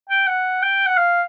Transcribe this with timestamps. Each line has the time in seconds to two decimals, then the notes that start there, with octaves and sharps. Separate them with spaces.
0.09 G5
0.27 F#5
0.62 G5
0.86 F#5
0.97 F5